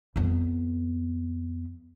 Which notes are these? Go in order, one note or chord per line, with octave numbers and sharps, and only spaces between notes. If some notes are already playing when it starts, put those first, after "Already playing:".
F2 B3